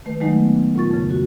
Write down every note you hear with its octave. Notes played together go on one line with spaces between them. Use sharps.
D#3 A3 B4
D#3 F#3 G#3 A3 D#4
B3
D2 A#2 F4 C#6 A6
F2 C#3
F#4